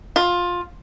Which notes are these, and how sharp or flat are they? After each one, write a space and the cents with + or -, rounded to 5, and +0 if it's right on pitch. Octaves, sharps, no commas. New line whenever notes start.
F4 +15